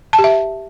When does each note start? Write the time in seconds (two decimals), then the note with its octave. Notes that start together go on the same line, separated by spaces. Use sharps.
0.13 A5
0.19 G4
0.24 E5